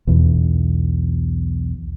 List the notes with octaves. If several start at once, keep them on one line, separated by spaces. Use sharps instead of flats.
B1 E2